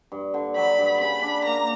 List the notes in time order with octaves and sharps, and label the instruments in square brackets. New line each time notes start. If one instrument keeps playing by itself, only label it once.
[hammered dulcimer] G2
D3
[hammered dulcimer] F#3 [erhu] B5
[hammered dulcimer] G2
[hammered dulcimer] C#3 [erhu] B5
[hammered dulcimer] D4
[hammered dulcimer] A#3 [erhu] A#5